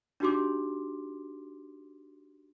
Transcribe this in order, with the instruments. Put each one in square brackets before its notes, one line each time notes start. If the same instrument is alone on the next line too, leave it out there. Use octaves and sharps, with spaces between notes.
[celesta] D4 D#4 F#4 G4 C6 D6